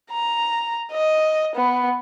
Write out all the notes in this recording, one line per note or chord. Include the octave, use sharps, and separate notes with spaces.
A#5
D#5
B3